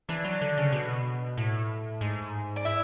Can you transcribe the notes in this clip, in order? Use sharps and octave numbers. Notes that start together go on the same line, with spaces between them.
E3 D4 D5
F#3
D3
C#3
B2
A2
G#2
D5
E4 E5